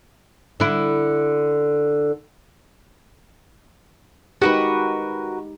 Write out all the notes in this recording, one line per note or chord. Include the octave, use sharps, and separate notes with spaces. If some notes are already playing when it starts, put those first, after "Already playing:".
D3 E4
G#3 D#4 F#4 G4 A#4 B4